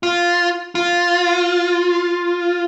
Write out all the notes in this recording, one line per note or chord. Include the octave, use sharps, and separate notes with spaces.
F4
F4